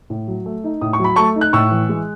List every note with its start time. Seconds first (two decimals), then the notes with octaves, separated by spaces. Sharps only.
0.10 A2
0.28 F#3
0.46 A3
0.64 D#4
0.81 A2 D#6
0.93 C#6
0.99 F#3 B5
1.16 A3 A5 C#6
1.36 D#4
1.41 F#6
1.53 A2 C#6 E6
1.71 E3
1.89 G#3